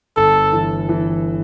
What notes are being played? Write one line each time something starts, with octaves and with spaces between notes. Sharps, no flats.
G1 A4
E3
E3